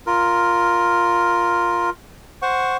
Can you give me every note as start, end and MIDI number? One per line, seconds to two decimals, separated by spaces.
0.07 1.90 65
0.07 1.90 70
2.42 2.77 72
2.42 2.77 78
2.42 2.77 85